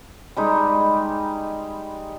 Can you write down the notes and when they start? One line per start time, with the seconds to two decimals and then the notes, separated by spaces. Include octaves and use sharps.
0.36 G3 G#3 D#4